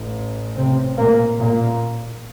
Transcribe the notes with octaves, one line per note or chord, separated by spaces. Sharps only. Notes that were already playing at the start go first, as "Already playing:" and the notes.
Already playing: A1 A2
C3 C4
A#2 A#3
A#2 A#3